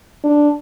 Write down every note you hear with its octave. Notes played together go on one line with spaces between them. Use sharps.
D4